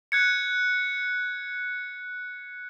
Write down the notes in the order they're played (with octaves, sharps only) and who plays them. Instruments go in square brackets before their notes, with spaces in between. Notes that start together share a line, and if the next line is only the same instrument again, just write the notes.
[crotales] F#6 G#6 C#7